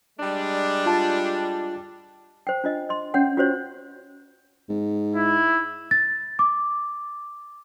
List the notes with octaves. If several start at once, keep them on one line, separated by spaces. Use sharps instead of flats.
G3 G#3 D4
F4 A5
C5 G5
D4 F4 D#5
D#5 C6
C#4 C#5 F#5 G5
F4 F#4 C5 C#5
G#2
E4
A6
D6